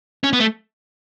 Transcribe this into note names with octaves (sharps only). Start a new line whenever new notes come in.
C#4
B3
A3